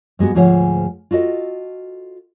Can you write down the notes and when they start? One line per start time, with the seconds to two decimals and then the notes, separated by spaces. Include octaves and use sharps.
0.19 G2 G#3 B3 F#4
0.35 D2 G#2 F3 G#4 C#5 F#5
1.11 F4 F#4 A4 D#5